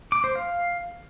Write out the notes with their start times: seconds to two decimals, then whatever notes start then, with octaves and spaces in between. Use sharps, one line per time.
0.12 D6
0.24 C5
0.36 F5